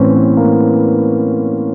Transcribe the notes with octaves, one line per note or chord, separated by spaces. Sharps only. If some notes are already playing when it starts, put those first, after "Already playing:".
Already playing: A2 E3 C4 C#4
B3
A#3